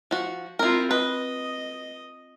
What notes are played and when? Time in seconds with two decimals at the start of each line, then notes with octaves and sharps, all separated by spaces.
0.11 F3 F#4
0.59 C4 E4 F4 A#4
0.91 B4 D#5